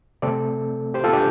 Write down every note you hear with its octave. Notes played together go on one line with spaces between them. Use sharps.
C3 A3 C4 A4 D5
G4 C5
F4 A4
D4 G4